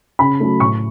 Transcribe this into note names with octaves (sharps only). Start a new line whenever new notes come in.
C#3 B5
F#3 A3
A2 C#6